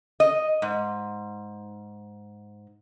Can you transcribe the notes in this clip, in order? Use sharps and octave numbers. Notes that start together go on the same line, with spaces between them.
D#5
G#2